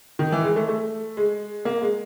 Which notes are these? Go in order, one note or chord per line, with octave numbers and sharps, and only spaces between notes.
D#3
E3
G#3
A3
A3
G#3
A#3
G#3